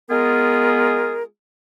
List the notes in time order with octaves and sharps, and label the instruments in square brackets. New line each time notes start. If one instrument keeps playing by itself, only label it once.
[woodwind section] G#3 B3 F4 G#4 A#4